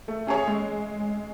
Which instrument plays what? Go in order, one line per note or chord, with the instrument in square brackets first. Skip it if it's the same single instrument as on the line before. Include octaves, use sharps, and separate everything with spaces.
[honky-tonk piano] A3
C#4 G#4 C#5
G#3